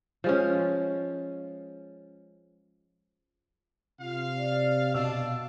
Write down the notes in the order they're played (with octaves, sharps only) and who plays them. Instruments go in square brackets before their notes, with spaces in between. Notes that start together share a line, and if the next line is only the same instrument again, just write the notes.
[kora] F3 G#3 C#4
[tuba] C3 [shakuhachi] F4 [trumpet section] F5
[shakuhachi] D5
[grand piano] B2 F#4 E6 [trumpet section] D4 A5 [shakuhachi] F5